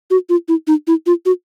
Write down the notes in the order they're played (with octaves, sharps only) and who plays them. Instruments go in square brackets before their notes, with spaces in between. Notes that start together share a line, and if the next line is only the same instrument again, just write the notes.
[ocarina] F#4
F4
E4
D#4
E4
F4
F#4